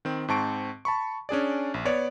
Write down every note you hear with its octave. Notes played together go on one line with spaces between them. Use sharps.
D#3 C4
G#2 C4 A5 C#6 D7
A5 B5 C#6
C#4 D4 G#4 D5
A#1
B3 C#5 D5